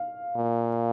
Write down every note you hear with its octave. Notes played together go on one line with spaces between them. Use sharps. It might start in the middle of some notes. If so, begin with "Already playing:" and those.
Already playing: F5
A#2